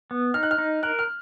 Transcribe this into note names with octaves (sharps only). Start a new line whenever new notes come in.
B3
D#4 F6
F#6
F6
D#4
A#4 F#6
F6